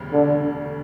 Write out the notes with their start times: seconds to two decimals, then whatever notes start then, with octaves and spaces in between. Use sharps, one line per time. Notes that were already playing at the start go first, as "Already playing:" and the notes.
Already playing: E1 D2 C#3 G3
0.13 D3